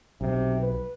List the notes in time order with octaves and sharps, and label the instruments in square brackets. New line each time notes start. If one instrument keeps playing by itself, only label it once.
[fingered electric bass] B1 [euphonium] C3
[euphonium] B4